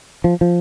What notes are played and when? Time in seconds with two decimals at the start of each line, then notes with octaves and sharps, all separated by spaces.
0.24 F3
0.41 F3